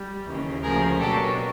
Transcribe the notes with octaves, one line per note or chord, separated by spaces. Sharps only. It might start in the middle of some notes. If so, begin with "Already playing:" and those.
Already playing: G3
D#2 C#3 E3
D2 C#3 F3 A#3 G#4 A#4
B2 F#3 A#3 D4 G4 A4